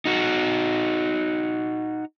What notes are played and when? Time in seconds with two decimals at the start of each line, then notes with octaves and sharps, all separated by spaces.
0.05 D#4 F#4